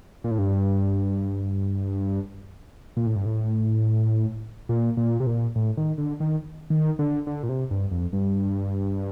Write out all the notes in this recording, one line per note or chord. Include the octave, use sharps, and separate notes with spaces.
A#2
A2
G2
A#2
A2
G2
A2
A#2
A#2
C3
A#2
A2
D#3
D3
D#3
D#3
D3
D3
A#2
C3
G2
F2
G2